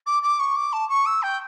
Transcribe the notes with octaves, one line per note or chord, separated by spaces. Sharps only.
D6
D6
C#6
D6
A5
C#6
E6
G5